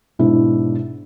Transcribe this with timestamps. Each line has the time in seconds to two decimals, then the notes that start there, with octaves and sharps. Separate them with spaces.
0.19 G#2 B2 D4 E4